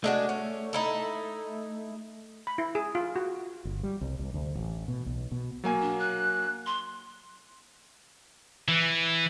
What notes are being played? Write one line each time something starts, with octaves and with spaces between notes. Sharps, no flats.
G#3 A3 D4 F#4
C#4
D#4 E4 A4
B5
E4
G#4
F4
F#4
G1
G3
C2
C2
D2
A1
B2
B1
B2
F#3 A#3 G#5
D4
F#6
C6
E3